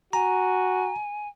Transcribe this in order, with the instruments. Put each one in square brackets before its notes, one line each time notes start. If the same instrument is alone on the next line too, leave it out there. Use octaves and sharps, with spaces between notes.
[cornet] F#4 [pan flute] G#5 [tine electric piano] A#5